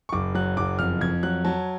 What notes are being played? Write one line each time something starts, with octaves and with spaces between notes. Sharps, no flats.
C#6
F#1 D6
F#3 F#6
F#1 D6
F2 F6
F2 G#6
F#3 F#6
F#3 A5